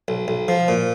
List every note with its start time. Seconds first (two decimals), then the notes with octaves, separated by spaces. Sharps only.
0.08 B1
0.28 B1
0.48 F3
0.68 A#2